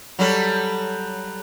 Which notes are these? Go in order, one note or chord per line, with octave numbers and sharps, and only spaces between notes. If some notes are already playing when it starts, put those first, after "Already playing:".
F#3 G3 A4